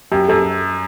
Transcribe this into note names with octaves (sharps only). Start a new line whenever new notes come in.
F#2 G4
F#2 A4